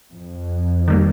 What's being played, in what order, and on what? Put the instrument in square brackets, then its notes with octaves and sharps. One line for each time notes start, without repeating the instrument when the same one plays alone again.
[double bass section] F2
[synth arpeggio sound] D#3 G3 A#3